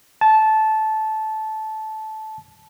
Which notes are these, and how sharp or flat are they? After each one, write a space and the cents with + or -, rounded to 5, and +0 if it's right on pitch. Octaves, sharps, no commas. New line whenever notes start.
A5 -15